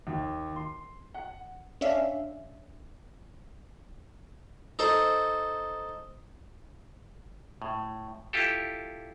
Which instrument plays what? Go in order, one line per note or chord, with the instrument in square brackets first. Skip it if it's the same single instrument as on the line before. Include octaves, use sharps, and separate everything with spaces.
[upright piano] D#2
C6
F#5
[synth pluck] C#4 D4 E5 F5
[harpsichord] D#4 A4 C5
[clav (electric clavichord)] A2
E4 F4 G4 A4